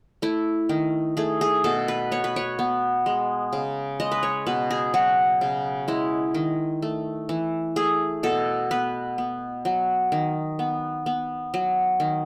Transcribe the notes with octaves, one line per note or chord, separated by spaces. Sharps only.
A3 E4
D#3
A3 G#4
G#4
B2 A4
B4
B3 C#5
B4
C#5
B3
G#3
C#3
G#3 D#5
B4
C#5
B2 B4
G#4
F#3 F#4
C#3
G#3 E4
D#3
A3
E3
A3 G#4
B2 A4
B3 B4
B3
F#3
D#3
B3
B3
F#3
D#3